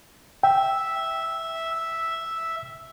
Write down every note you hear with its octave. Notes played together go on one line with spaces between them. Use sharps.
E5 G5